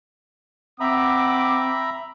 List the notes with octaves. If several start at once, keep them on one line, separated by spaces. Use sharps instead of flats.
C4 E5 F#5 A#5 B5 D6